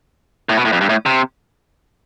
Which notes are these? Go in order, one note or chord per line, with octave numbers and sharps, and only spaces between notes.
A2
B2
A2
F2
G2
A2
C3